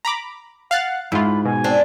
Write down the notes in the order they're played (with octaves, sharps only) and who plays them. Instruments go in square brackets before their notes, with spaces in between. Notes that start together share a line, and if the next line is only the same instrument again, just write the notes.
[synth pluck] A#5 B5 D6
[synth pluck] F5 F#6 A6 [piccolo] F#5
[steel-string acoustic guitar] G#2 [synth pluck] E4 F4 [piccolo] B5
[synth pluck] B2 [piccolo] G#5
[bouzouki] C4 D4